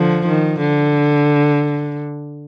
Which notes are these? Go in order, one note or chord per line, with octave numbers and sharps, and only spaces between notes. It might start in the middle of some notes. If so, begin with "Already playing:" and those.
Already playing: D3 F3
D#3
D3